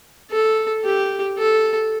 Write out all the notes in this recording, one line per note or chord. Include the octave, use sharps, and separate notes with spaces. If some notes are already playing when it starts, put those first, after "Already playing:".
A4
G4
A4